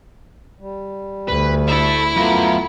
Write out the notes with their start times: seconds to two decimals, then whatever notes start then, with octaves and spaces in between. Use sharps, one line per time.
0.60 G3
1.28 D2 B4
1.68 E4 A4 E5
2.16 F#3 A3 B3 F4 A#4